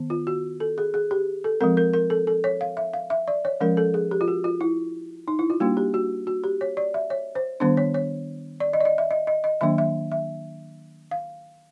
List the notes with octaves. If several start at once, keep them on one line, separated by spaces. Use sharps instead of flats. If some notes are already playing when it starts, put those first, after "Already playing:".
Already playing: D#3 B3
F4
F#4
A4
G#4
G#4
G4
A4
F3 G#3 C4 A#4
A#4
A#4
A4
A4
C#5
F5
E5
F5
E5
D5
C#5
F3 G#3 C#4 A#4
A4
G#4
G4
F4
F#4
F4
E4
D#4
E4
F4
G3 A#3 D4 F#4
G4
F#4
F#4
G4
C#5
D5
E5
C#5
C5
D#3 G3 B3 D4 C5
C#5
C#5
D5
D#5
D5
D#5
E5
D#5
D#5
D#5
D#3 F#3 A#3 D4 E5
E5
E5
F5